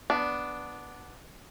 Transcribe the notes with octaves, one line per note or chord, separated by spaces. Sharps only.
B3 D4